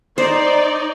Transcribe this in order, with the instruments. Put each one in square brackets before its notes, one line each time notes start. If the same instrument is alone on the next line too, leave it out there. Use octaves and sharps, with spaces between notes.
[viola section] D#4 D5 [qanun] C5